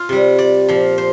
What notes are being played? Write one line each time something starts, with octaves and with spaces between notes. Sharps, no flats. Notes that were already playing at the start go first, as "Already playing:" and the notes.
Already playing: F4
C3 G3
D5
A#2 F3
C5